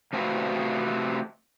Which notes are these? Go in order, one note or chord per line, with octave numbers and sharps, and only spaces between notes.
C3 A3 C4 F4 F#4 B4